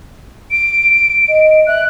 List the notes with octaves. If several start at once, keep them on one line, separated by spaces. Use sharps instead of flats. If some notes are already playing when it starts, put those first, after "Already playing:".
D7
D#5
E5 F#6